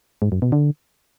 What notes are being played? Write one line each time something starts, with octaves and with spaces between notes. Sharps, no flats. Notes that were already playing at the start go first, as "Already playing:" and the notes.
G#2
F#2
B2
D3